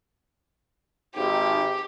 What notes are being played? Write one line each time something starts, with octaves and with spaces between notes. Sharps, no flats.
G#1 D#4 G4